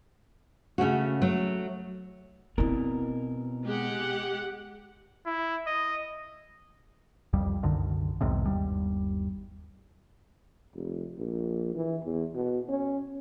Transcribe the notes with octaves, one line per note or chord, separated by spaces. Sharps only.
C#3 A3 C#4 F#4
F#3 A3
B2 C4 E4 A#4
G#3 G4 F#5
E4
D#5
C2 F2 G3
C2 F#2 D3 D#3
B1 E2 G#2 C3
G1 D#2 G3
F1
A#1
E3
E2
B2
C#4